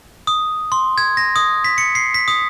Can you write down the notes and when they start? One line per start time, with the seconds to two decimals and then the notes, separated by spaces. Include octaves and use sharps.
0.27 D#6
0.72 C6
0.98 G#6
1.17 A#6
1.36 D#6
1.64 B6
1.78 C#7
1.95 C7
2.14 B6
2.28 D#6